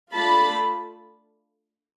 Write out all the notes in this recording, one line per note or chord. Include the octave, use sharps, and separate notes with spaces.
A3 D4 F4 A5 B5